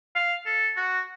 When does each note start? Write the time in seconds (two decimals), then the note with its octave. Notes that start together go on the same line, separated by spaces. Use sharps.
0.15 F5
0.46 A4
0.77 F#4